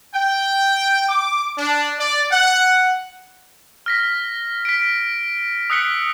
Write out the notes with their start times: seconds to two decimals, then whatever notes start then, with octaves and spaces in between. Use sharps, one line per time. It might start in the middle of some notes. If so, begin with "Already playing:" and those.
0.15 G5
1.09 D6
1.57 D4
1.99 D5
2.32 F#5
3.86 F6 A#6 B6
4.65 B6 D7
5.70 D#6 E6 F#6 B6 C#7 G7